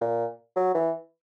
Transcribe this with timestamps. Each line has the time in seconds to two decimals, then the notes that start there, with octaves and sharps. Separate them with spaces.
0.01 A#2
0.56 F#3
0.74 E3